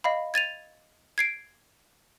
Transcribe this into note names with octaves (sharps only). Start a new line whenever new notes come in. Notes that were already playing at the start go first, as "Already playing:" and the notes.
D#5 F5 B5
G#6 A6 D#7 F7
G#6 C7 D7